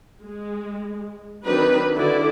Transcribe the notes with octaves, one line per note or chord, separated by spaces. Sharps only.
G#3
D#3 F#3 C4 D4 D#4 B4
D3 D#3 E4 F#4 A4 D5